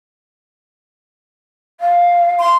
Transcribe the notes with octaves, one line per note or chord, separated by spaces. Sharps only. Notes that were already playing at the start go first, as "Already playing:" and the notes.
F5
C6